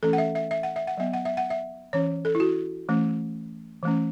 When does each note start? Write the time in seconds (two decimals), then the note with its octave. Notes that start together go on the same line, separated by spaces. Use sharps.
0.03 E3 A3 C#4 A4
0.13 F#5
0.18 E5
0.35 E5
0.51 E5
0.63 F#5
0.76 E5
0.87 F#5
0.97 F#3 B3 E5
1.13 F#5
1.25 E5
1.37 F#5
1.50 E5
1.93 E3 C#4 C#5
2.25 A4
2.35 E4
2.40 F#4
2.89 E3 A3 C#4
3.83 E3 A3 C#4